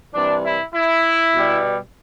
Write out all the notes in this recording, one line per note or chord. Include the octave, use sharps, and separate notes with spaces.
C3 E3 G3 D4
E4
E4
B2 G3